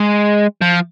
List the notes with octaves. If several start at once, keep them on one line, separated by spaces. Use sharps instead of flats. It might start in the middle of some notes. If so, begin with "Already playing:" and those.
Already playing: G#3
F3